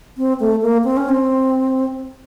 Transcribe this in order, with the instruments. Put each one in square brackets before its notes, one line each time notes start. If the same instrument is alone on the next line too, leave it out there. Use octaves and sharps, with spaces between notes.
[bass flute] C4
A3
A#3
C4
C#4
C4